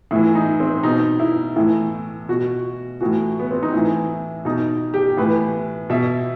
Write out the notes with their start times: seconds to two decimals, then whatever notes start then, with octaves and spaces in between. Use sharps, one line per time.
0.11 A2 E3 E4
0.35 D#4
0.60 C4
0.83 B2 D#4
1.19 E4
1.56 A2 E3 E4
2.29 B2 F#4
3.01 A2 E3 F#4
3.39 B3
3.51 C4
3.63 D#4
3.73 A2 E3 E4
4.45 B2 D#4
4.94 G4
5.17 A2 E3 B4
5.90 B2 E5